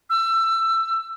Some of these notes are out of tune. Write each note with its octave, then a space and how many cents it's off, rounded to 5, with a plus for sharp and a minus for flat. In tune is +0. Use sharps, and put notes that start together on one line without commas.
E6 +20